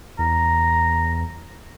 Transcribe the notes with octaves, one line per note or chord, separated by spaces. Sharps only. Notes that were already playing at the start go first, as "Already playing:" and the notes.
E2 A#5